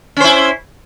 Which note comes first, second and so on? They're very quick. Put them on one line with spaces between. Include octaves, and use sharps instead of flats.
C#4 C5 E4